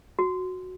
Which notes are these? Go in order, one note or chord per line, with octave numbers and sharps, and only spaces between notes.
F#4